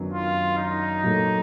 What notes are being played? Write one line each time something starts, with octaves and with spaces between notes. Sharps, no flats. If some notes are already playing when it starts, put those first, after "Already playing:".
Already playing: F#2 D#3 F#3 B3 D4
F4
D#4
A#2 F#3 A3